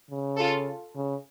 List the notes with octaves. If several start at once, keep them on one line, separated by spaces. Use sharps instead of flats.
C#3
F4 A4
C#3